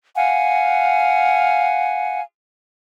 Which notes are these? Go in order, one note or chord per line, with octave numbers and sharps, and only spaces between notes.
F5 F#5 G#5